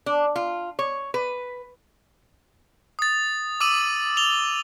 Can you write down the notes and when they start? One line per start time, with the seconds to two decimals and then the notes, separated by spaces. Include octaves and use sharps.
0.06 D4
0.36 F4
0.79 C#5
1.14 B4
2.99 D#6 A6
3.61 D6 E6 D#7 F#7
4.17 F7 G7